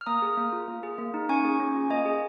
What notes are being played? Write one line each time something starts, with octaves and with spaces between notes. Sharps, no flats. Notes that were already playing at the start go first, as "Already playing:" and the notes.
F6
A#3 A#5 D#6
G#4
A#3
F4
A#3
G#4
A#3
D#4
C#4 G#5 C#6
G#4
C#4
F4
A#3 D#5 G#5
G#4